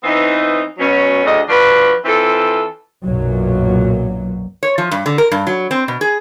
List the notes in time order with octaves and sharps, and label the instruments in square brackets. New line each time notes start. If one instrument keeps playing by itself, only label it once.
[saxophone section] E3 B3 C4 D#4
B2 F#3 C#4
D2 A2 C#3 D4 D#5
F3 D4 F#4 B4
E3 C4 F4 A4
[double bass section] B1 F#2 A#2 F#3
[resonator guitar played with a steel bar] C#5
F3
G2
D3
A#4
G2
F#3
C4
B2
G#4